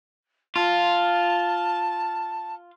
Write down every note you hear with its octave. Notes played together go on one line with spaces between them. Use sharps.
F4 A5